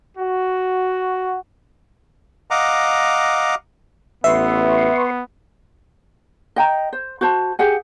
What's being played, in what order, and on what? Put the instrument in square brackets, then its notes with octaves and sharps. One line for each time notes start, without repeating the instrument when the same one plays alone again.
[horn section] F#4
[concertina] D#5 F5 F#5 A#5 D6
[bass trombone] A1 [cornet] B3 [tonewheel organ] B4 C6 C#6 [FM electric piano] E5
[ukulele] D#5 G5 A#5
C5
F#4 C5 A5
G4 G#4 F#5 G#5